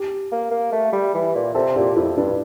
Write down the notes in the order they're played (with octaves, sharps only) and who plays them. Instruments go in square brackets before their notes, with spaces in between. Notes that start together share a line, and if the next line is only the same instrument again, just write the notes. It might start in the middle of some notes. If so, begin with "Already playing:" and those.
Already playing: [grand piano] G4
[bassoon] A#3
A#3
A3
G3
E3
A#2
[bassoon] C3 [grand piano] A4
[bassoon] A#2 [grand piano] G4
[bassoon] F2 [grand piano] E4
[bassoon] G2 [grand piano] D4